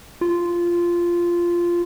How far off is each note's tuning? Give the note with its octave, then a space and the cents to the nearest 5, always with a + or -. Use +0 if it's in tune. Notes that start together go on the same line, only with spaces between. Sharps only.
F4 -10